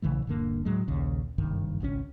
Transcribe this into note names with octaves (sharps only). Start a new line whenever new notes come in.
A#1 C#3 E3 A3
D#1 G2 D3 A#3
A2 F#3 G#3
A#1 D#2 C#3
F#1 C2 G2 D#3
G#1 C#2 D#3 C#4